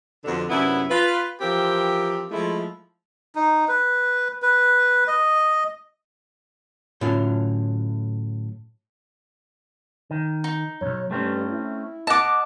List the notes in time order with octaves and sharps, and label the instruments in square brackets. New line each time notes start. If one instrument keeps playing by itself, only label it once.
[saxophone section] F2 B2 D3
F#2 C3 B3 D4 E4
F4 B4
E3 F3 C4 G4 A#4
F3 G#3 A3 E4
[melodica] D#4
B4
B4
D#5
[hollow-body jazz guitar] A2 D3 F#3 C#4 F4
[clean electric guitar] D#3
[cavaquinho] D#4
[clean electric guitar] B1 F#2 [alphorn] C#5
[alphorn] G2 [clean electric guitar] A3 C4 C#4
[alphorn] E4
[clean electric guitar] D#5 F#5 [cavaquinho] A5 D6